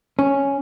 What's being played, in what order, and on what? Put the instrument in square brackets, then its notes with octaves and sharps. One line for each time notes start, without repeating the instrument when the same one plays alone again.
[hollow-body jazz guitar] C#4